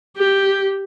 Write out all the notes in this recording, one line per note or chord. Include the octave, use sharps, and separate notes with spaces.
G4